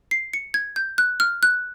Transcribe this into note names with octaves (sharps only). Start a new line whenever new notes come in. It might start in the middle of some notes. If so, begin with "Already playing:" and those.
C7
C#7
G#6
G6
F#6
F6
F#6